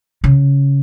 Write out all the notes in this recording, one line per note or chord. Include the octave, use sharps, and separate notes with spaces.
C#3